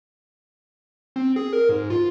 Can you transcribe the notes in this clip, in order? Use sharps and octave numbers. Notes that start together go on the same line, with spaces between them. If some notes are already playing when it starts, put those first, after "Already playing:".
C4
G#4
A#4
G#2
F4